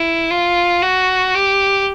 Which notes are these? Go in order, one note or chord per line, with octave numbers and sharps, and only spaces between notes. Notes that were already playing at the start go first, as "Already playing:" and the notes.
Already playing: E4
F4
F#4
G4